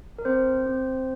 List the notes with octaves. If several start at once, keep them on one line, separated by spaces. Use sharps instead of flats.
A#4
C4 C5
C4